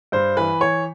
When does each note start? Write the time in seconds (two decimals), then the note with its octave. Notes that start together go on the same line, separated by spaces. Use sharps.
0.12 G2 C5
0.37 E3 B4
0.60 E3 C#5